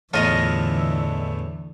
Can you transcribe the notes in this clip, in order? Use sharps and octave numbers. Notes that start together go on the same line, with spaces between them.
E2 A2 D3 E3 A3 F4 D#5 F6